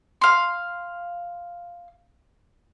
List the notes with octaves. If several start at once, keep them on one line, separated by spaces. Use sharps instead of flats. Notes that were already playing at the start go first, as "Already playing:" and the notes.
F5 C6